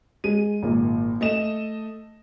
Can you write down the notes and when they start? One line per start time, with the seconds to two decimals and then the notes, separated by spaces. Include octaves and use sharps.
0.24 G#3 D#7
0.63 G#1 A#2 A#3
1.21 A3 D#5 E7